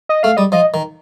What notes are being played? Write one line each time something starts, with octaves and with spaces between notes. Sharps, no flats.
D#5
A3 F5
G3 D#5
F3 D#5
D#3